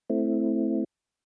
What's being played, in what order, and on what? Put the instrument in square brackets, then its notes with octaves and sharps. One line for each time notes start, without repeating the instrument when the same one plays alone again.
[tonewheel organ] A3 C4 E4